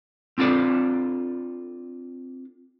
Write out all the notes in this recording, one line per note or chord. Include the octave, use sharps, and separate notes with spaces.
C4 D4 F4 A4 D5